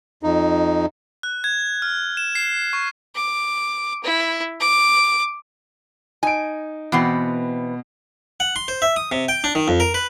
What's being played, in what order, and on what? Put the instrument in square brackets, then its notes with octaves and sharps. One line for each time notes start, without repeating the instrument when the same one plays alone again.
[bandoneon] F2 D#4
[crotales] F#6
G#6
F6
E7
C7
C#6
[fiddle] D6
E4
D6
[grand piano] D#4 D7 [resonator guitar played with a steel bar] G#5
[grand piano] B2 C7 [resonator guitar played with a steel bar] E3 B3 C4
[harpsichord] F#5
C6
C5
E5
D#6
C3
G5
D4
D#3
F2
A#4
B4